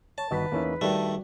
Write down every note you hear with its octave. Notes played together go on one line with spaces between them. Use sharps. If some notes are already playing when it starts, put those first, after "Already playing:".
C#5 A5
G1 D#3 F#4 B4 D#5 F#5 B6
E2 A#3 C#4 D#4 E4
G2 D#3 G3 A3 F#4 D5